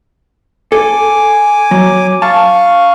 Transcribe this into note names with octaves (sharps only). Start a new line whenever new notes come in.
A4 G#5 D6
F#3
F5 A5 C#6